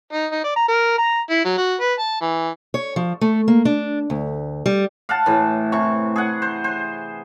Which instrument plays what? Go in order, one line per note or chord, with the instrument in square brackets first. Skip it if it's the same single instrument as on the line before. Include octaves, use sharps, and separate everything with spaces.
[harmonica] D#4
D#4
D5
A#5
A#4
A#5
E4
F#3
F#4
B4
A5
E3
[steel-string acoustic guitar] C#5
F3
A3
A#3
D4
D2
G3
[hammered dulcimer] F5 F#5 A5
A2 E3
C3 E3 C#6
G#4 F#5
C5
C5